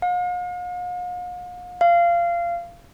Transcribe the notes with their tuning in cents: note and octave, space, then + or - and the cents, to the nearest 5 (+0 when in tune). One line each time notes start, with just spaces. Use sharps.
F5 +45
F5 -20